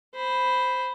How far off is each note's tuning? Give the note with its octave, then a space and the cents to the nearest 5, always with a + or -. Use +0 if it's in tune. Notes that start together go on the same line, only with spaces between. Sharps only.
C5 +0 B5 +0